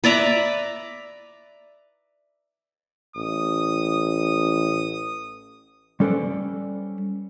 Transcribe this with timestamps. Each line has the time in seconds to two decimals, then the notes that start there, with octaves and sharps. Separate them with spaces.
0.04 B4 D5 E5 A#5
3.16 A1 D#6
6.00 G3 C#4 A4 B4 C5 D5